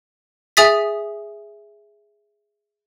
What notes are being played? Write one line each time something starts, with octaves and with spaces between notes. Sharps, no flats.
G#4 E5 G#5 D#6 A6 B6